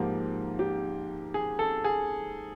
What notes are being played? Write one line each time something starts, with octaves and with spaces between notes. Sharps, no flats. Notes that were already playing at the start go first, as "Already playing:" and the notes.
Already playing: G#2 F3 A#3 G4
G4
G#4
A4
G#4